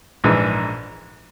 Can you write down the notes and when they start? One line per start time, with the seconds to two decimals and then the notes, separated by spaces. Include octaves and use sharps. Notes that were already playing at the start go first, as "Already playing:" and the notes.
0.24 A#1 G#2 E3